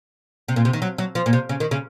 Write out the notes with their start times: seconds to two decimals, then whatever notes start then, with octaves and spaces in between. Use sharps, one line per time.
0.48 C3
0.56 A#2
0.65 C3
0.73 D#3
0.82 F#3
0.98 F#3
1.15 F3
1.26 A#2
1.33 C3
1.49 C#3
1.60 D#3
1.71 C#3